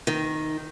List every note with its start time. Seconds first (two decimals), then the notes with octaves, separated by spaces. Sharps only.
0.07 D#3